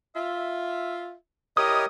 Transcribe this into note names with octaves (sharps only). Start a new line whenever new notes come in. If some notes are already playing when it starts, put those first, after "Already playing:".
F4 E5
E4 G4 A#4 C#5 D#5 D#6